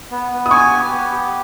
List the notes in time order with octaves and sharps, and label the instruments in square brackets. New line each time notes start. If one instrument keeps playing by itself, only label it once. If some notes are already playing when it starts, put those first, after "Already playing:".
[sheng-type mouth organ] B3
B3
[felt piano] D#6
[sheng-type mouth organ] G#5 [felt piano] C#6
[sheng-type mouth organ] G4
B3
G4